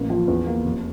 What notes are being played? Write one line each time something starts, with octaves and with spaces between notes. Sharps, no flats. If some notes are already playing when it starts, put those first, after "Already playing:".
Already playing: A1 A#3
F3
E2
A#3
F1